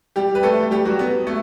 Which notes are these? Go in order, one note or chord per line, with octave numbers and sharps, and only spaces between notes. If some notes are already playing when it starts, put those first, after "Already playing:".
G3 G4
B4
A3 A4
G3 G4
F#3 F#4
B3
A3